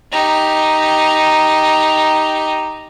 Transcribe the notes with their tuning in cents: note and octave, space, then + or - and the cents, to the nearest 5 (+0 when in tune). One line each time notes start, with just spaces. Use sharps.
D#4 +0 G4 +0